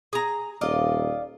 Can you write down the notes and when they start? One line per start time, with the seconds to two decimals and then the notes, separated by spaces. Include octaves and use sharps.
0.13 G#4 A#5
0.61 D#1 F4 D5 D#5